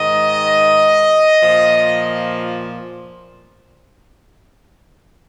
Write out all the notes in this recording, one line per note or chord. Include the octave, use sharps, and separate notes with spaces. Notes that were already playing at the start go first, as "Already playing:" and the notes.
Already playing: G#2 D#3 D#5
A#2 F3